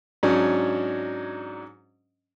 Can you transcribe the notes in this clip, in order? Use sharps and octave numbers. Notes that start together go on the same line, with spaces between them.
G#2 F#3 C#4 D4